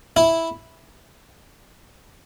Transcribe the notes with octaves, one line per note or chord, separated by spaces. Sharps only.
E4